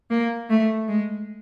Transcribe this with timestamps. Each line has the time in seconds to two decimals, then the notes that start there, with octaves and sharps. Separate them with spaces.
0.10 A#3
0.50 A3
0.89 G#3